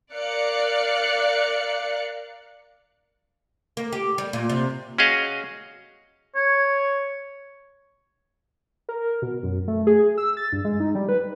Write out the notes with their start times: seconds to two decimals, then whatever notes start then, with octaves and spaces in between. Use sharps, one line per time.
0.14 A#4 D5 F5 F#6 C#7
3.77 A#3
3.93 G4
4.18 G3
4.33 A#2
4.49 C3
4.98 C#4 F#4 G#4 D#5 F5
6.35 C#5
8.89 A#4
9.22 B2
9.43 F#2
9.68 A3
9.87 G#4
10.18 E6
10.37 A6
10.52 G2
10.65 G#3
10.80 D#4
10.95 G3
11.09 B4